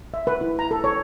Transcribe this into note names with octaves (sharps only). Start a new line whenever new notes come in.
E5
B4
E4
A#5
A4
C#5